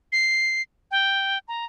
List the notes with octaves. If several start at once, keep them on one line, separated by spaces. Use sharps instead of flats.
C7
G5
A#5